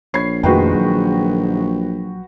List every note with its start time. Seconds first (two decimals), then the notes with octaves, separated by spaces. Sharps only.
0.14 A#1 C#5 B5 G#6 C7
0.43 F2 A#2 D#3 G#3 A3 F#4 B4 G5
0.75 F#3